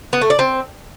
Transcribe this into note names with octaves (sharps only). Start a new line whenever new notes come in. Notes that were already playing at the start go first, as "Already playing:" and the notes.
B3
A3
D5
C4